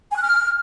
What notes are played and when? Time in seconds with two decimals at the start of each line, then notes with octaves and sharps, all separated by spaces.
0.11 G#5
0.17 F#6
0.22 F6